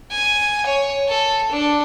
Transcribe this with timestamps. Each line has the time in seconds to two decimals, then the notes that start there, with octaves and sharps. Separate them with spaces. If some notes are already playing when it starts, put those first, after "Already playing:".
0.11 G#5
0.66 C#5
1.08 A4
1.51 D4